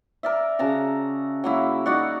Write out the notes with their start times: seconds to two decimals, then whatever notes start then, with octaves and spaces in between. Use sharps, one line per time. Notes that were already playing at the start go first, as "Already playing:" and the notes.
0.23 A#4 D5 E5
0.59 C#3 F#4 A5 A#5
1.44 F#3 A#3 E4
1.86 D#4 F#4 D5 F#5